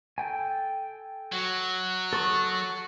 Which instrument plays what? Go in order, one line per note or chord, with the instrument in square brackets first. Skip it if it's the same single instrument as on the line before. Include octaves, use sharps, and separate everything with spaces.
[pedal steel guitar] A4 G5 G#5
[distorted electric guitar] F#3 [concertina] F#4
[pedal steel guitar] A4 C#6 D#6